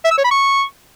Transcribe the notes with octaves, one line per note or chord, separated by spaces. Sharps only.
E5
E6
C#5
B5
C#6